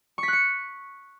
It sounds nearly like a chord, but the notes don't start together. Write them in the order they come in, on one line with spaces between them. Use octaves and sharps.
C#6 B6 F#6 C#7